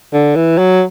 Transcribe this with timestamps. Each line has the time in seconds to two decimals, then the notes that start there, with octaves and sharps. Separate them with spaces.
0.13 D3
0.35 E3
0.58 F#3